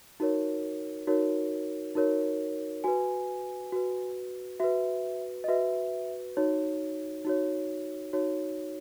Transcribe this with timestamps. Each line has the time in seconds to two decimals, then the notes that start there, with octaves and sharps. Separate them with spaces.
0.20 D#4 F#4 A#4 C#5
1.07 D#4 F#4 A#4 C#5
1.95 D#4 F#4 A#4 C#5
2.84 F#4 B4 G#5
3.72 F#4 B4
4.60 F#4 B4 E5
5.44 D#5
5.48 F#4 B4 E5
6.37 D#4 F#4 C#5
7.25 D#4 F#4 C#5
8.13 D#4 F#4 C#5